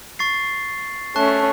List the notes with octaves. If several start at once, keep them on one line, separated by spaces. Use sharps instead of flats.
C#6 A6 C7
A3 C#4 A5 C#6 F#6